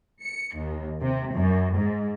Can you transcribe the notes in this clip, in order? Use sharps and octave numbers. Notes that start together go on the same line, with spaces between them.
C#7
D#2
C3
F#2
G#2